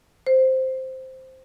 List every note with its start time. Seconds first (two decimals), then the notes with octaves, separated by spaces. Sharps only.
0.27 C5